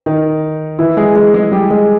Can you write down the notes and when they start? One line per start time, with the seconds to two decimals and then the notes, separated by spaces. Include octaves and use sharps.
0.06 D#3 D#4
0.79 E3 E4
0.97 G#3 G#4
1.16 G#3 G#4
1.34 G#3 G#4
1.52 G3 G4
1.70 G#3 G#4